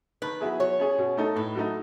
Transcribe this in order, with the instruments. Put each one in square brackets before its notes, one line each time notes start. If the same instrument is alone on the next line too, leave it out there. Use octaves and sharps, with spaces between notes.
[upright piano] D#3 [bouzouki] B4
[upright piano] F#3 B3 E4 G#4
[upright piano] F#3 [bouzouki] C#5
[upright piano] C#4 G#4
B2
A3 D#4 A4
[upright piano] A2 [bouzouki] B4
[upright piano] F#3 A3 D#4